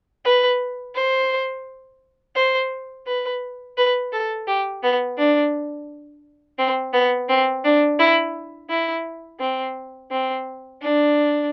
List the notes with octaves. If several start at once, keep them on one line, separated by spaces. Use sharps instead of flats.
B4
C5
C5
B4
B4
A4
G4
B3
D4
C4
B3
C4
D4
E4
E4
C4
C4
D4